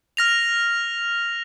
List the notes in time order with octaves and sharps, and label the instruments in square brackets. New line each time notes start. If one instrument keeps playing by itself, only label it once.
[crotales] F6 A#6 F7